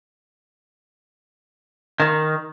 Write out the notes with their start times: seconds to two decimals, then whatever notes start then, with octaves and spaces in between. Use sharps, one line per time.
2.00 D#3